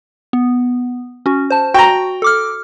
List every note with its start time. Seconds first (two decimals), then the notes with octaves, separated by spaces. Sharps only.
0.33 B3
1.26 C#4 F#4
1.50 C5 A5
1.74 F#4 G5 A#5
2.22 A4 D6 F6